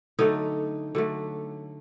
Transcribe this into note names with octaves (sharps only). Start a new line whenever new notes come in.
D3 F#3 A3 D#4
D3 F#3 A3